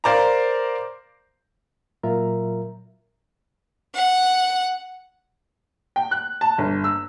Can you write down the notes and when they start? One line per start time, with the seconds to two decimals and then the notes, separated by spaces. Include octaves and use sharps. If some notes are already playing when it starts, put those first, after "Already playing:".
0.04 A#4 C5 D5 F5 A#5
2.03 A#2 F#3 F4 A#4 E5 A#5
3.95 F#5
5.96 G5
6.11 F#6
6.41 A5
6.58 G1
6.84 E6